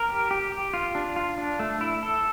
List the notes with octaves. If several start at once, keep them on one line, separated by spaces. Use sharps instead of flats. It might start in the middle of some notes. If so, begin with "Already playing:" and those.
Already playing: A#4
G4
G4
G4
F4
D4
F4
D4
A3
E4
A4